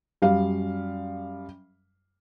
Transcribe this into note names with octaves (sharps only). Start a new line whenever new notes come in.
F#2 G3 F5